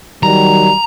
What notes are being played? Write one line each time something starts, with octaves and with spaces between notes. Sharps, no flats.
D#3 F#3 G3 A#5